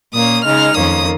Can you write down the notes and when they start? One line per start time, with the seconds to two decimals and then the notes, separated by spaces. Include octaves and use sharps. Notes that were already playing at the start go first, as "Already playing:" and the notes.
0.14 A#2 A#3 C#4 D#6
0.44 C#3 G#3 D#4 F6
0.75 F2 D#3 A#3 C#4 D#6